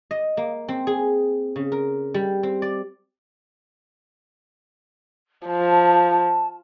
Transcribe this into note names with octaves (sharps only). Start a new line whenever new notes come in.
D#5
A#3
C4
G#4
C#3
A#4
G3
C4
D5
F3 A5